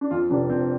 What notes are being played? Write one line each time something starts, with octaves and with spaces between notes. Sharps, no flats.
D4
F2 F4
F1 D4
F1 C4